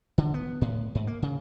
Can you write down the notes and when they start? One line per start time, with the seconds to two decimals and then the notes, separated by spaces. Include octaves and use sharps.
0.18 D3
0.34 B3
0.61 A2
0.95 G#2
1.07 A#3
1.22 C#3